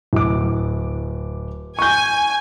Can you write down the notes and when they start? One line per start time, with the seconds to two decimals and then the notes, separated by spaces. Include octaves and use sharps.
0.13 D1 D6
1.79 G#5 C#6 G6